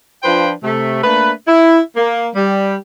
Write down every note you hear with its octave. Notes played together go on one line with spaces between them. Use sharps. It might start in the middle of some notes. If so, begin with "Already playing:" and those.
F3 D4 F4 B4 C5 G5
C3 A3
A3 A#3 D4 B4
E4
A#3
G3